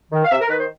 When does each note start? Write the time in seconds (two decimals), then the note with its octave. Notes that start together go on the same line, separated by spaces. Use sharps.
0.11 D#3
0.25 F5
0.30 C3 E5
0.40 A#4
0.49 D#3 B4
0.58 C5